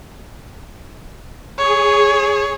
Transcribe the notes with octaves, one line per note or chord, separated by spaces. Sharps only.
G#4 C#5